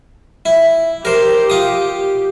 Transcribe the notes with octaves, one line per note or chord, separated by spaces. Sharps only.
E4
G4 A#4 C5
F4 D#6